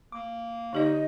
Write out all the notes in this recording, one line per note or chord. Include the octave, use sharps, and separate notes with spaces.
A#3 D6
D3 D#4 G4 D5 D#5